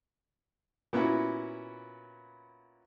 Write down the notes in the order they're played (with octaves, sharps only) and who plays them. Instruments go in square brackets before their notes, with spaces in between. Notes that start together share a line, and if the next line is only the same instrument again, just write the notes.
[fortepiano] A#2 B3 C#4 E4 F#4